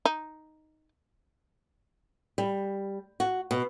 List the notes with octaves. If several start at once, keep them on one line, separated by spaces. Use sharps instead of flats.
D#4
G3
F#4
B2